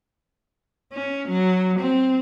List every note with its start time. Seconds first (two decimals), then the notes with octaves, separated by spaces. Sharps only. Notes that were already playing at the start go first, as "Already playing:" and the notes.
0.92 C#4
1.28 F#3
1.79 C4